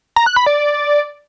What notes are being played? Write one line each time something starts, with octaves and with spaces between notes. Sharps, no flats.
A#5
F#6
B5
D5